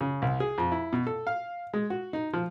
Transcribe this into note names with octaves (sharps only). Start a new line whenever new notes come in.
C#3
C2
G#4
F2
E4
B2
A4
F5
G#3
F#4
D#4
F3